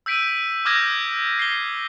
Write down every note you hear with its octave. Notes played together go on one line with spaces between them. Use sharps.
E6 G6 B6 D7 D#7
D6 D#6 F6 G6 G#6 A#6
C7 G7